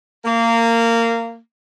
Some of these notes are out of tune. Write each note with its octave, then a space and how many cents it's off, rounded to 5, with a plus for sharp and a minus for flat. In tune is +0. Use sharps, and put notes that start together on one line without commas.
A#3 -20